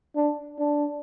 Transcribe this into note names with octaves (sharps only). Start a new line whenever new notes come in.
D4
D4